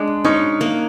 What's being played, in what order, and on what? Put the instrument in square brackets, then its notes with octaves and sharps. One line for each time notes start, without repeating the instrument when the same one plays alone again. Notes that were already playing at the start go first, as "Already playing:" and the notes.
Already playing: [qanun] G#3 [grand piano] D4
[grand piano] C#4 [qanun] D#4
[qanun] A#3